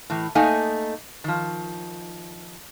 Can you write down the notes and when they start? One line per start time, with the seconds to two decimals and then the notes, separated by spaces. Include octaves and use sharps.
0.10 A2 E3
0.35 A3 A#3 D#4 D#5 G#5
1.24 D#3 F3